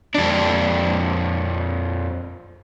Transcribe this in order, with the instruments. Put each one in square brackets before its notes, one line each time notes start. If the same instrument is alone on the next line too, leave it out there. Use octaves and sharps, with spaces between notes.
[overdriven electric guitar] F2 D4